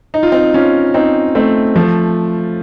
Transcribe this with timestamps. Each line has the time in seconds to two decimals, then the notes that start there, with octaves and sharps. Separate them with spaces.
0.14 D#4
0.23 F4
0.32 C4 D#4
0.54 C#4 F4
0.94 C4 D#4
1.35 A3 C4
1.76 F3 A3